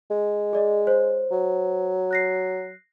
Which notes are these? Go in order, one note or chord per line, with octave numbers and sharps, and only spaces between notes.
G#3
G#4 D5 D#5
C5 C#5
F#3
F#6 A#6 C7